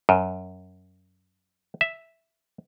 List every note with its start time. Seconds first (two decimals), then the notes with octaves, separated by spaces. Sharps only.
0.09 F#2
1.81 E5